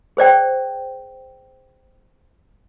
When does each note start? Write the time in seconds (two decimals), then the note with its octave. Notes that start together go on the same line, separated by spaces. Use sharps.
0.17 G#4 C5 D5 G5